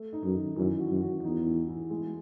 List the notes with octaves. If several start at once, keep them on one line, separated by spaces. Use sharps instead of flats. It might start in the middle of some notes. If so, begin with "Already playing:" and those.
Already playing: A3
D#4
F#2
D#3
F#2 E3
F#4
F#2
F#4
E2 D#4
E3
E3
G#3